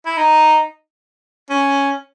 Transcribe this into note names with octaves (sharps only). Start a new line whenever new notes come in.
E4
D#4
C#4